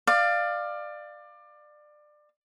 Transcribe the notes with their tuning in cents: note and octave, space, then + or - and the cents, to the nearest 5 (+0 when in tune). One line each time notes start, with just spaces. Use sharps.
D5 +25 F5 +0